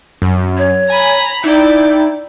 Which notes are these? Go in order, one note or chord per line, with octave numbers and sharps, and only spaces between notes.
F#2
C#5
G#5 A#5 B5
D#4 E4 D5 G5